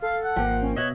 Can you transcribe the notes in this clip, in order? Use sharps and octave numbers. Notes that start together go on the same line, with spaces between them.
A4 F5
F#5
G#1 F3 A#3 G5
C#4
B2 C#5 D#5 E5 F#5